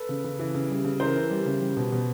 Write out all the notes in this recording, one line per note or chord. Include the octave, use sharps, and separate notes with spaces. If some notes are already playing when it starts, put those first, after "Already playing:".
Already playing: A4 B4
C#3
C#3
E3
C#3
G3
C#3
E3 A#4 C5
E3
G3
C#3
G3
B2
B2